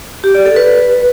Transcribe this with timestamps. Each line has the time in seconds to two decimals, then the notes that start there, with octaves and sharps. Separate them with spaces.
0.24 G4
0.35 D5
0.45 A4
0.56 B4